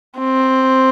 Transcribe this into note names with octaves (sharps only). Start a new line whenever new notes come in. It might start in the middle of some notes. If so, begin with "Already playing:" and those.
C4